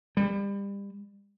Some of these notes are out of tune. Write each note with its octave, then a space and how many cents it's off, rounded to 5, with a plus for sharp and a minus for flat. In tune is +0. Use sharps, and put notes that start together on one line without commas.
G3 +30